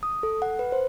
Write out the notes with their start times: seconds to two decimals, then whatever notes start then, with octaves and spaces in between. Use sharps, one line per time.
0.03 D#6
0.23 A4
0.42 F#5
0.59 B4
0.72 C5